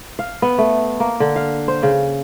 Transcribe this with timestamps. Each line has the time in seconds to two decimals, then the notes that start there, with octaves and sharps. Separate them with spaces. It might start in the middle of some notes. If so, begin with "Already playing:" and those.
0.19 F5
0.42 B3
0.58 A3
1.00 A#3
1.20 D3
1.36 F5
1.68 C5
1.83 C#3